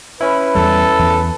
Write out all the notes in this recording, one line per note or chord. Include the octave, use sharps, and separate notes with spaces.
C#4 E4 B4
E2 G3 A4
E2